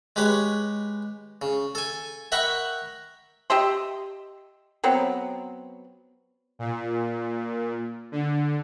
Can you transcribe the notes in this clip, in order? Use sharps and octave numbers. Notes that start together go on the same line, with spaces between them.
G#3 G4 B4 C#5
C#3
A4 G#5
A#4 E5 F#5 G5 B5 C#6
G4 D#5 E5 C6
F#3 B3 C4
A#2
D3